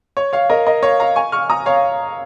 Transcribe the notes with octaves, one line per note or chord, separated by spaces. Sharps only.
C#5
C#5 F5
A#4 D#5
A#4 D#5
C#5 F5
F5 A#5
G#5 C#6
C#6 F6
A#5 D#6
C#5 F5